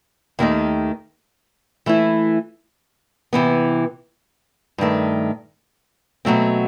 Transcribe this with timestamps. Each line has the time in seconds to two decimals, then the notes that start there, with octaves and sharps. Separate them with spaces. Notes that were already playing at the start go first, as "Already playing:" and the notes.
0.39 D#2 D#3 A3 D#4
1.86 E3 A3 E4
3.33 C3 E3 B3
4.78 G2 D#3 A3
6.25 B2 F#3 A3 C4